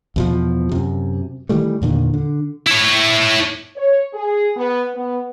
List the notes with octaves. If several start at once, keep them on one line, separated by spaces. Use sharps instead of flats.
E2 B2 F3
F#2 C3
D#3 E3 G3 A3
E2 A#2 D3 D#3
D3
E4 C#5
C#5
G#4
B3
B3